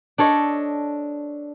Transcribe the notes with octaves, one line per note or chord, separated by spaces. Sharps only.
D4 A4 C#5 D#5